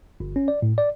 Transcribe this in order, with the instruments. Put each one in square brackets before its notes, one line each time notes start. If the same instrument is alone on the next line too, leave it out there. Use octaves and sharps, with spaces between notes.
[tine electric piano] G1
C#4
D5
A2
D5